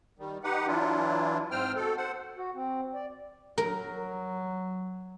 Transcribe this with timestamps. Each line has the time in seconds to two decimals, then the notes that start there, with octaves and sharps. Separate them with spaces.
0.19 D#3 G3
0.44 D#4 G4 B4 F#5
0.67 E3 F#3 D4 E4 F4
1.51 G#2 C4 C5 G5 F6
1.76 B2 A4
1.97 C5 F#5
2.38 F#4
2.55 C4
2.95 D5
3.58 F#3 A#4